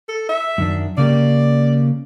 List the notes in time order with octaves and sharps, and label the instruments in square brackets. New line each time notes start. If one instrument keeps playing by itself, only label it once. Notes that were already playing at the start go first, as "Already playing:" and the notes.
[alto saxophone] A4
E5
[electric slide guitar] F#2 D#3 D4
[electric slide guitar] C#3 A#3 G4 [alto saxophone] D5